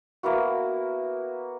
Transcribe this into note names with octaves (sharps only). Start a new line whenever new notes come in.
A#3 B3 E4 F#4